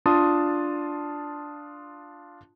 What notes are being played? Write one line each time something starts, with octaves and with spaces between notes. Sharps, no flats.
D4 F4 A5 C6 D#6